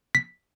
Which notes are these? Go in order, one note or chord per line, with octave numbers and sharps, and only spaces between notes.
B6